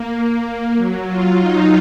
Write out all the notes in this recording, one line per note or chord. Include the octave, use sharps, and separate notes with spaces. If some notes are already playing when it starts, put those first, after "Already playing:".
Already playing: A#3
F#3
F4
D#4